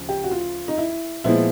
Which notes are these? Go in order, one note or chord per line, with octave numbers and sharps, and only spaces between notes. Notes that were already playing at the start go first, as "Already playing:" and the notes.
Already playing: D2 C#3 F3
G4
F#4
F4
D#4
E4
A#2 F3 G#3 B3 E4